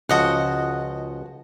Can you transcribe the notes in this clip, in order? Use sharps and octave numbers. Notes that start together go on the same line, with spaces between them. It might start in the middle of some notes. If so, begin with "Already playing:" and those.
C#2 F3 F#4 D#5 F#5